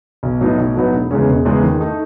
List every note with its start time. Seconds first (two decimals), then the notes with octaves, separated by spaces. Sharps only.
0.23 B1
0.41 A2 F#3 B3 D#4
0.58 B1
0.75 A2 F#3 B3 D#4
0.93 E1
1.11 E2 C#3 G#3 C#4
1.28 E1
1.45 E2 C#3 G#3 C#4
1.63 D#3
1.81 A3 D#4